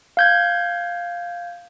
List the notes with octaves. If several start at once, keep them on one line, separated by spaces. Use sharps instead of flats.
F5 G6 G#6